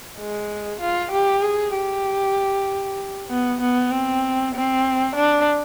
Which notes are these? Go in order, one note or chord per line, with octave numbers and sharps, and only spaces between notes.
G#3
F4
G4
G#4
G4
B3
B3
C4
C4
D4